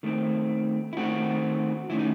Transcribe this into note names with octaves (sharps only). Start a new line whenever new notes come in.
D#3 A3 C4
E4
D#3 A3 C4 F#4
D#3 A3 C#4 E4
D#4